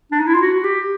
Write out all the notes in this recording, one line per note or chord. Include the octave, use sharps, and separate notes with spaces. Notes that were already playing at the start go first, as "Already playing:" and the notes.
D4
D#4
E4
F4
F#4
F#4
G4